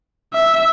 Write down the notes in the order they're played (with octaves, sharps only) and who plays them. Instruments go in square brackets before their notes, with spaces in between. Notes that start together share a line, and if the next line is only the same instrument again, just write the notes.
[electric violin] E5